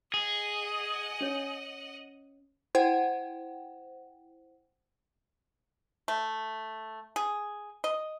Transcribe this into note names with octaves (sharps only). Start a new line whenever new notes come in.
G#4 D#5 F#5
C#4 C#5
E4 C5 F#5 G5
A3
G#4
D#5